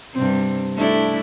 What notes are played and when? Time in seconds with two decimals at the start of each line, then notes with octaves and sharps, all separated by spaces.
0.13 G2 C3 C4
0.77 A3 D4 E4